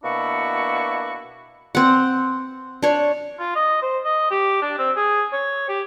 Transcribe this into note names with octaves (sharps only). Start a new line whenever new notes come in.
B2 A#3 D4 E4 F#4 C#6
C4 F#5
D4 C#5
F4
D#5
C5
D#5
G4
D4
C4
G#4
C#5
G4